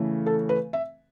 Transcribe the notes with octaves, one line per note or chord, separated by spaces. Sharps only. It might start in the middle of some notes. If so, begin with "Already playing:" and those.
Already playing: C#3 E3 A3
A4
B4
E5